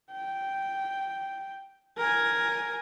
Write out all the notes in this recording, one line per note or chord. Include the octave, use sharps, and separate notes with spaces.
G5
A#4 G#5